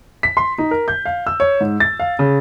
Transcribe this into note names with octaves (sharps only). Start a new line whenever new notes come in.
B6
C6
D#4
A#4
G6
F5
E6
C#5
G#2
A6
F5
C#3